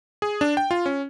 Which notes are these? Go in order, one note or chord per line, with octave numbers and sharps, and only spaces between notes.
G#4
D4
G5
F4
C#4